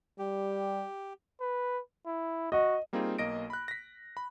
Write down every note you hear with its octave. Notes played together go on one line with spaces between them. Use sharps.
G3 G4
B4
E4
F#4 D#5
G3 A#3 C4 D#4 F4 G#4
B1 A#3 D#5 A#6 D7
B5 F#6
A#6 B6
B5